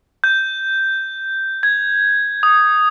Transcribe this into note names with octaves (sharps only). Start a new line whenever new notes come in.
G6
G#6
D#6